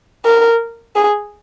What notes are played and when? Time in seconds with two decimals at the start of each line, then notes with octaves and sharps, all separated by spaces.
0.24 A#4
0.96 G#4